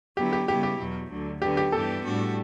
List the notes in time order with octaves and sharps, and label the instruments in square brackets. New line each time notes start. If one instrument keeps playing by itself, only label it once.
[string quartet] D3 F#3 B3 E4 [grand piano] G4
[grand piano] G4
[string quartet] C#3 G3 B3 E4 [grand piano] G4
[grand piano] G4
[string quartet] E2 B2 F#3
D2 D3 F#3
[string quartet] D3 F#3 B3 [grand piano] G4
[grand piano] G4
[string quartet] G2 E3 B3 D4 G4 [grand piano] A4
[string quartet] A2 G3 D4 F#4